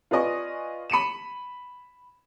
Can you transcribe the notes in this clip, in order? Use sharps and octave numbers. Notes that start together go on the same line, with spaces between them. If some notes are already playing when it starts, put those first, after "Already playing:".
F4 B4 D5 D#5 G#5 C#6
B5 C#7 D#7 E7